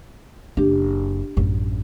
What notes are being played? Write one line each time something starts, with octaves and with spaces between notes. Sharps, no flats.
F#1 D4 G4
A1 F#2